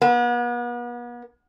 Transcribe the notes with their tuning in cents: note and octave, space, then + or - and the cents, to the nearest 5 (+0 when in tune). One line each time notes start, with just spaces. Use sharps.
B3 -40